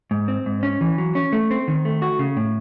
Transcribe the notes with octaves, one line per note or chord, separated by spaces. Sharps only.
G#2
C4
G#2
C#4
E3
F#3
C#4
A3
C4
D#3
A3
F#4
C#3
A2